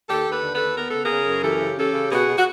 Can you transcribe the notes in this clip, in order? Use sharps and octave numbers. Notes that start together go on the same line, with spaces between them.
D#2 G4 A4
D#2
A4 B4
D3
A4 B4
D#2
B3 A#4
C#3 A4
G#4 A#4
C#3
F#2
E3 G4 A4
C#3
C#4 G4 A4
C#3
B2 F#4 G#4
B2
F#4